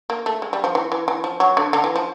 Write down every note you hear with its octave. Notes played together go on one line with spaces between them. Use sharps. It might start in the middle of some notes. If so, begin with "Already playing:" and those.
A#3
A3
G#3
G3
F3
E3
E3
E3
F3
F#3
D3
D3
E3
F3